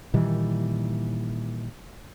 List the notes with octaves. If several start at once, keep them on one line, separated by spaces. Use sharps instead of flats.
A#2 D#3 E3 G3